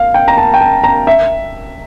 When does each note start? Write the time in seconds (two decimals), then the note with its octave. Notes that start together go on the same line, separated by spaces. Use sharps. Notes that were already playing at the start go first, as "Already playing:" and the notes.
Already playing: F5
0.14 G5
0.28 A#5
0.38 A5
0.54 G5
0.61 A5
0.84 A#5
1.07 E5